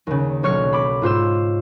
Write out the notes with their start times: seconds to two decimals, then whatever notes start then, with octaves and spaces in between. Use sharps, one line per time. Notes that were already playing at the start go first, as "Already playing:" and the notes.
0.07 D#2 C#3
0.43 B1 C#5 F6 C#7
0.73 B5 D6
1.02 G#2 F4 C5 E6